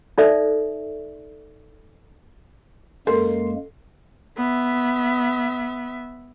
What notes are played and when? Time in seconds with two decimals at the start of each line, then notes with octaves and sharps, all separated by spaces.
0.18 D#4 A4 D5 E5
3.07 F#2 G#3 A#3 A4 A#4 C6
4.37 B3 E5